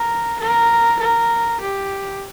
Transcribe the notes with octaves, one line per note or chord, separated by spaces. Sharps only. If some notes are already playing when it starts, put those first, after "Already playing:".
Already playing: A#4
A#4
A#4
G4